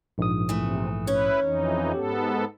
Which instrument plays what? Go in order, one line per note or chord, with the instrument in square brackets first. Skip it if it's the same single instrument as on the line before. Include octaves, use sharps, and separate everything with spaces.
[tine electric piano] A#1 G#2 D#6
[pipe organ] C3 [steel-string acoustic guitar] E3 A3
[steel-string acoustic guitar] C#4 C#5 [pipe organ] E4 B4
[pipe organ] F2 E3 D#4
[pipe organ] G#2 B3 A4 [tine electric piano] G4